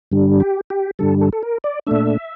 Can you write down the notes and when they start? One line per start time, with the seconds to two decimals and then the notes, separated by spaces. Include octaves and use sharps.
0.12 G2 D3 G3
0.40 G4
0.70 G4
0.99 G2 D3 G3 A4
1.21 A4
1.33 A4
1.43 A#4
1.64 D5
1.87 A#2 A3 D4 E5